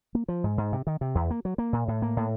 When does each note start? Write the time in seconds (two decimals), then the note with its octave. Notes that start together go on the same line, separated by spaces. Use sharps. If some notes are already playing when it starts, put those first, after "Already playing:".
0.15 A#3
0.28 F3
0.44 G#2
0.58 G#2
0.73 C3
0.87 D#3
1.01 C3
1.15 E2
1.31 A#3
1.45 F#3
1.58 A#3
1.73 A#2
1.88 A2
2.02 A#3
2.17 A2